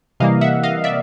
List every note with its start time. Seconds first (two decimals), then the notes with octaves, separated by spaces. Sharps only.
0.20 C3 E3 G3 A#3 D#5 F5
0.41 E5 F#5
0.63 D#5 F5
0.84 D5 E5